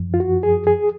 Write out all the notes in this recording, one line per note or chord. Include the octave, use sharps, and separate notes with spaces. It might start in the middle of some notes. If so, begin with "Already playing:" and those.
Already playing: F#2 F3
F4
F#4
G#4
G#4